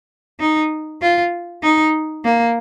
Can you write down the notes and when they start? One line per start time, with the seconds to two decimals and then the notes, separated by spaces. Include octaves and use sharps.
0.40 D#4
1.01 F4
1.63 D#4
2.25 A#3